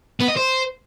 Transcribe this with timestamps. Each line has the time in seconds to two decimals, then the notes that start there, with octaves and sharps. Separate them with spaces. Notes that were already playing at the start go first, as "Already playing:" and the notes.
0.21 B3
0.29 D#5
0.37 C5